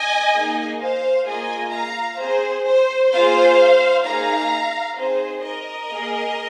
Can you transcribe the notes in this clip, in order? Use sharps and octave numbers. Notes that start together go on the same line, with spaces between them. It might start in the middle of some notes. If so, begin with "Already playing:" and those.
Already playing: D#5 G#5
A#3 D#4 G#4
C5 F5
A#3 F4 G#4 D#5 G#5
F5 A#5
C4 G#4 C5
C5
A#3 F4 G#4 C5 F5
A#3 D#4 G#4 F5 A#5
C4 D#4 G#4 C5
A#4 D#5
A#3 G#4